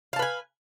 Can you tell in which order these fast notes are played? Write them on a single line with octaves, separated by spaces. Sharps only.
F5 A5 B4 G#5